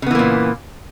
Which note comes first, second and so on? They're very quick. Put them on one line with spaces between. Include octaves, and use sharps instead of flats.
C#3 B3 E3 A#3 A#2